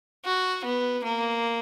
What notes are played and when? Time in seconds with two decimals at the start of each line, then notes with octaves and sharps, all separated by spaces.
0.25 F#4
0.65 B3
1.04 A#3